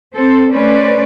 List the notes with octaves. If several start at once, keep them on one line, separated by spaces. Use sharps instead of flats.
C4 A4 C5
A3 C#4 B4 C5 D5